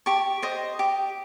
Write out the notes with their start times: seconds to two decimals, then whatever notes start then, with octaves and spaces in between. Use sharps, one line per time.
0.06 G4 C#6
0.43 C5 D#5
0.79 G4